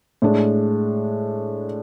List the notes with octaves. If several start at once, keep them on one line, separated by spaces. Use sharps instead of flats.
A2 G#3 D4